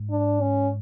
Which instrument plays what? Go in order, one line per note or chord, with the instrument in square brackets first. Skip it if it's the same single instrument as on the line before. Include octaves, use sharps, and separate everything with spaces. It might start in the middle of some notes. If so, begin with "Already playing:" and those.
Already playing: [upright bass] G#2
[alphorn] D4
C#4